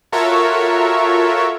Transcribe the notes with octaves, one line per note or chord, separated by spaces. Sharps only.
F4 F#4 A4 A#4 C#5 E5